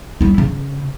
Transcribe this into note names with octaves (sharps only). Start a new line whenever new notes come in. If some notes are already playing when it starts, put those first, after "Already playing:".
G3 E4
C#3